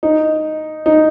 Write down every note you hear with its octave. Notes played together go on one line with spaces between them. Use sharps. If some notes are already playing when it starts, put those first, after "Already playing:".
D#4
D#4